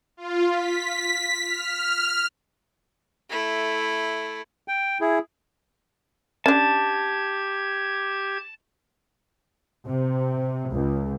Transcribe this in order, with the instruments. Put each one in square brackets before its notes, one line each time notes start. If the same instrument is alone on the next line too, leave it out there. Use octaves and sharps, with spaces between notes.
[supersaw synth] F4
B6
F6
[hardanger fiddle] A3 E4
[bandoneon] G5
E4 G#4
[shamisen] C#4 D4 [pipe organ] G4 G#6 [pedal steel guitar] A5
[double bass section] C3
C#2